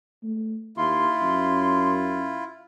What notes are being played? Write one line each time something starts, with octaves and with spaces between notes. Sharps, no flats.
A3
D#2 E4 F4 C6
F#2